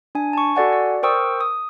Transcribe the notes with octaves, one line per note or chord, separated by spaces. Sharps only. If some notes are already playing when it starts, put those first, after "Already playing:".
D4 G#5
A5 C#6
F#4 A4 D5 F#5 G#5
D5
A#4 C5 G5 C#6 D#6 E6
D#6